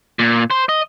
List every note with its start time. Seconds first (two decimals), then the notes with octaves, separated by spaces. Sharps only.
0.19 A#2
0.51 C5
0.69 D#5